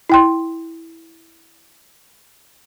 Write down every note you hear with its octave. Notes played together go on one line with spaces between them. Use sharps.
E4 G5 C6